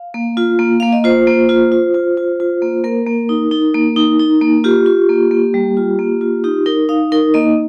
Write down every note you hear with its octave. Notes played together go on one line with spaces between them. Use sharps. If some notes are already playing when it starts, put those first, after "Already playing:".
Already playing: F5
A#3
F4
A#3
A#3 F5
D#5
F4 C5
A#3
F4
F4
F4
F4
F4
A#3
A#3 A#4
A#3
D#4
D#4
A#3
D#4
D#4
A#3
F4 G4
F4
A#3
A#3
G3
F4
A#3
F4
D#4 G4
D#4 A#4
D#4 F5
D#4 A#4
A#3 D#5